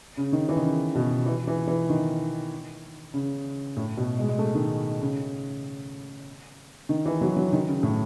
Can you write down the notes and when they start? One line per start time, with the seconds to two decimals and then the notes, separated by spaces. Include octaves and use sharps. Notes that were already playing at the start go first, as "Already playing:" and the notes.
0.17 C#3
0.33 D#3
0.49 E3
0.56 D#3
0.63 C#3
0.95 B2
1.26 E3
1.47 E3
1.67 E3
1.89 D#3
3.14 C#3
3.77 A2
3.97 B2
4.19 G#3
4.29 G#3
4.39 A3
4.55 D#3
5.01 C#3
6.89 D#3
7.06 E3
7.21 F#3
7.36 F#3
7.53 D#3
7.68 C#3
7.83 A2